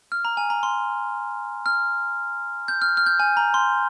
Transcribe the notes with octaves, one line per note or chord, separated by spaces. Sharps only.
F6
A#5
G#5
A#5
C6
F6
G6
F6
F6
G6
G#5
A#5
C6